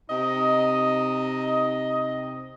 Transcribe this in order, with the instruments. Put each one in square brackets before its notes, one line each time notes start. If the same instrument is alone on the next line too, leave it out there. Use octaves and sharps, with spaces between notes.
[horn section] C3 D#4 D#5